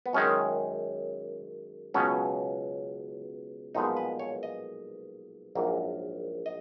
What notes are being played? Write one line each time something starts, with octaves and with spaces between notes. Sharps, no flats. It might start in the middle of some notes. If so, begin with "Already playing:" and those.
B3
F#2 D#3 G#3 C#4
C#2 B2 F#3 B3 C#4
B1 A#2 F3 G#3 B3 D#4
B4
C#5
D#5
A#1 G#2 F#3 A#3
D#5